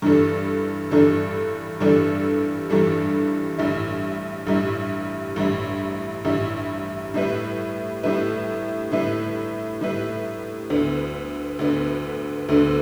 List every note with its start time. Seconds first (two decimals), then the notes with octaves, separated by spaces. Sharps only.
0.02 G2 E3 G3 D4 A4
0.91 G2 E3 G3 D4 A4
1.80 G2 E3 G3 D4 A4
2.70 G2 E3 G3 D4 A4
3.58 A1 G2 G3 E4
4.47 A1 G2 G3 E4
5.36 A1 G2 G3 E4
6.25 A1 G2 G3 E4
7.14 A2 G3 E4 B4
8.03 A2 G3 E4 B4
8.92 A2 G3 E4 B4
9.81 A2 G3 E4 B4
10.70 D2 D3 B3
11.59 D2 D3 B3
12.49 D2 D3 B3